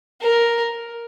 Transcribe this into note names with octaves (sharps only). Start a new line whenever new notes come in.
A#4